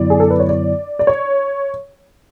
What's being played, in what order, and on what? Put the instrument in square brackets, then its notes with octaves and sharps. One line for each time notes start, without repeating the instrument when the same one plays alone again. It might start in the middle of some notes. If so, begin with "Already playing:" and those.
Already playing: [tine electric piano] F#2 D3 F#3 B3 E4 [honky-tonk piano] D5
[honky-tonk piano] G#4
A4
B4
C#5
D5
D5
C#5